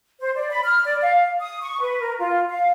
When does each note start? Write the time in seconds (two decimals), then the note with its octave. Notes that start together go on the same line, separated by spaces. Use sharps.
0.20 C5
0.35 D5
0.51 B5
0.65 F6
0.85 D5
1.02 F5
1.40 D#6
1.62 C#6
1.81 B4
2.00 A#4
2.19 F4
2.49 F5